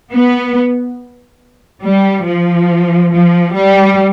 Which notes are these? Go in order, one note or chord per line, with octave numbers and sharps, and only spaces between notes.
B3
G3
F3
F3
G3